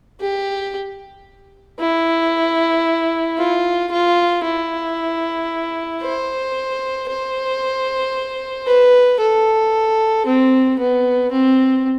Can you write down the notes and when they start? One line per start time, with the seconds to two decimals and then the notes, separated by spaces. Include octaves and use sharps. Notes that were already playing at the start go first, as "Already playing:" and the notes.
0.20 G4
1.79 E4
3.38 F4
3.91 F4
4.44 E4
6.03 C5
7.09 C5
8.67 B4
9.20 A4
10.26 C4
10.79 B3
11.32 C4